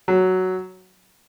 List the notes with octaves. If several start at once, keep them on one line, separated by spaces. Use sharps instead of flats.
F#3